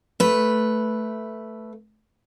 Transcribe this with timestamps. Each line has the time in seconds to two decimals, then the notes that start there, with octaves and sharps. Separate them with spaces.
0.20 A3 B4